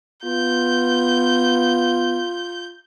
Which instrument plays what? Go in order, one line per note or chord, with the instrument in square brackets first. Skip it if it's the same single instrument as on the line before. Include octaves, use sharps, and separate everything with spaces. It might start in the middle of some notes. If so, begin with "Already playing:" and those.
[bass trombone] B3 [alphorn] F4 [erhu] G6